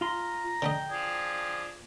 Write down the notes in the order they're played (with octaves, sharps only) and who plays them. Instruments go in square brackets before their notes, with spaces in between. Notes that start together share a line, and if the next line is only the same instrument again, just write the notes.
[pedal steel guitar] F4 C6 [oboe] A#5
[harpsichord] D3 A3 D#5 [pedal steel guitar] G5
[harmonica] F3 D4 [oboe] G#4